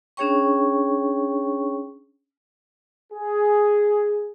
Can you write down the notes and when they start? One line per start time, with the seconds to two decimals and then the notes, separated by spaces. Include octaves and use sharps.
0.17 C#4 D4 G#4 C#5 G5 C#6
3.13 G#4